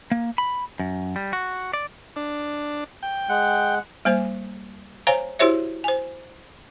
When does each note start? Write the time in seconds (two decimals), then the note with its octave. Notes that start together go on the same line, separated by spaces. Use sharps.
0.11 A#3
0.38 B5
0.79 F#2
1.16 G3
1.33 F#4
1.73 D5
2.16 D4
3.03 G5
3.29 G#3 F#5
4.05 G3 A#3 C5 G#5
5.07 C5 C#5 F5 G#5 A#5
5.39 E4 F#4 G4 C5 C#5 E5
5.84 C5 G#5